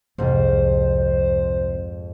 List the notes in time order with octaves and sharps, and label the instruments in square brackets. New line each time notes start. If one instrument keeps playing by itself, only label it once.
[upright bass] C2 C4 [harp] F2 G#2 [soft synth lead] C5